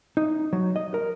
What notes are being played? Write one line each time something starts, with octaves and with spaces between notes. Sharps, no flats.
D#4
F#3
D#5
A#4